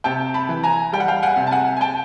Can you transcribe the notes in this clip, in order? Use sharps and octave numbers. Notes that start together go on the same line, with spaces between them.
C3 G5 A5
A5 B5
E3
G#5 A#5
G3 G5
F#5
F5 G5
F#5 G#5
C3
A5
F#5 G#5
G#5
G5 A5